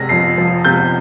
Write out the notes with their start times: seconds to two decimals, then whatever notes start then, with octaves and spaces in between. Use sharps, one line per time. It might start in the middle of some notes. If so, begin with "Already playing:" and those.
Already playing: C3 G#3 A#6
0.09 F2 C7
0.38 F3
0.65 C3 G6